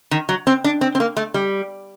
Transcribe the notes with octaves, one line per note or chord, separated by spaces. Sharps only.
D#3
F#3
C4
D4
C4
C4
A#3
A3
G3